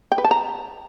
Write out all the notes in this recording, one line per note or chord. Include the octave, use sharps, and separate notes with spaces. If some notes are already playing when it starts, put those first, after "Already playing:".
G5
B4
A5
A#5